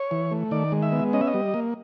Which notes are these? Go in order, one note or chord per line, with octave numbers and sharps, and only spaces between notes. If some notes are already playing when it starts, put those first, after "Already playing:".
Already playing: C#5
E3
A3
D#3 D5
G#3
E5
B3
C#4 D#5
E5
D#5
G3
A#3